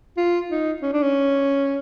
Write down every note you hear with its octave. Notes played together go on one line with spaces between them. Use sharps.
F4
D#4
C#4
D4
C#4